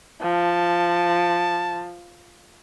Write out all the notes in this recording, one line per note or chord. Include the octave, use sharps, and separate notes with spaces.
F3 A5